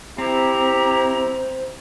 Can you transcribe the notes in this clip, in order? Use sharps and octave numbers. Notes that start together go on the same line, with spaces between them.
C4 E4 G4 C5 A#5